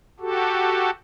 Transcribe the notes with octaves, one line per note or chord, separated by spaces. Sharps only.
F#4 G4 A4